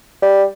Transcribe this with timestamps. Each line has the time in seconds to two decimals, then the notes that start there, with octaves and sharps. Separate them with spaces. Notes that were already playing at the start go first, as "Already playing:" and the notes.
0.22 G3